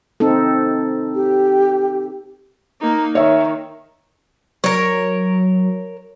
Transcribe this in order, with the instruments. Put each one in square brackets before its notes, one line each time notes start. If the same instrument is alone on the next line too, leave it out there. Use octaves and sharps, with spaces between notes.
[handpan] C4 D#4 A4
[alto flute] G4
[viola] A#3 D#4
[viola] D#3 [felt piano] C#5 E5
[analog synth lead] F#3 [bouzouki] A#4 C#5